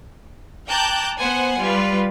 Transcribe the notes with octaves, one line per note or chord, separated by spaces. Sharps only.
G5 A5 A#5 D6 F#6 G6
B3 C5 F#5 G#5
G3 F4 B4